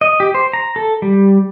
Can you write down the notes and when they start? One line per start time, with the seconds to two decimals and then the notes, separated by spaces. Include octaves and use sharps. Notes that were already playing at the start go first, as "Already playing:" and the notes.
0.01 D#5
0.20 G4
0.34 C5
0.53 A#5
0.76 A4
1.02 G3